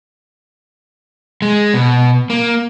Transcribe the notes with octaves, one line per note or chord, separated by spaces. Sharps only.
G#3
B2
A#3